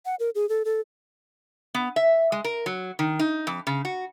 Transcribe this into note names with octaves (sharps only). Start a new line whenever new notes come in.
F#5
A#4
G#4
A4
A4
B3
E5
G#3
A#4
F#3
D#3
D#4
F2
C#3
F#4